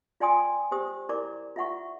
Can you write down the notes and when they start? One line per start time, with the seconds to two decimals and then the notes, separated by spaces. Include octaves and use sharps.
0.20 F4 D5 G5 G#5 C6 D#6
0.71 G4 C5 D#6
1.09 E4 A#4 D5 A#5 D6
1.56 F4 E5 F#5 C#6